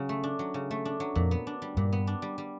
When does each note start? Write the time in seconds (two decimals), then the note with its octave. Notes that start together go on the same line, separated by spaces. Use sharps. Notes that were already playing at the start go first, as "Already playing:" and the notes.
Already playing: C#3 F#3
0.09 A3
0.24 D4
0.39 F#3
0.54 C#3
0.71 A3
0.85 D4
1.00 F#3
1.15 F2 A#2
1.31 B3
1.47 D4
1.62 G3
1.77 G2 A#2
1.93 B3
2.07 D4
2.22 G3
2.38 G3